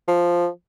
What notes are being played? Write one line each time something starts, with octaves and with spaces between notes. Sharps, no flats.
F3